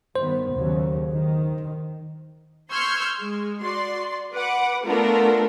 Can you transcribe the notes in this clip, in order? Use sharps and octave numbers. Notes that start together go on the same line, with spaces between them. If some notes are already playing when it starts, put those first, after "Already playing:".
G2 D#3 B3 C5
D#2 C#3 F#3
D#3
C6 C#6 E6 F6 G6 G#6
G#3
F#4 D5 C6
B4 F#5 D6
A3 B3 D4 F4 A4 A#4